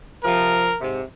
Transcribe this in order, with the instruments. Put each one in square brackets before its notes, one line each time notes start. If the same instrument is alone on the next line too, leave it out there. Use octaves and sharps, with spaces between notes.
[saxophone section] C3 F3 [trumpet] A#4
[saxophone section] G#2 C3